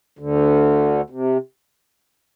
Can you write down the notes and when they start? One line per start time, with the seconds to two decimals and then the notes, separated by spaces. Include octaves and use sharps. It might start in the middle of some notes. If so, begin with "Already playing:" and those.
0.19 D2 D3
1.10 C3